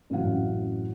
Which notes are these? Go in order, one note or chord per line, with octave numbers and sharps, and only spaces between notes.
A1 F#2 A2 C3 F5 F#5